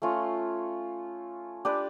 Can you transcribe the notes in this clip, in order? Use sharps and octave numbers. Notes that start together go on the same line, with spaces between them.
A3 C#4 F4
D4 G4 B4 D5